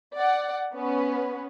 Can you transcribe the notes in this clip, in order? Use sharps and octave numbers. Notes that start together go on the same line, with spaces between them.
D5 F#5
B3 C#4 B4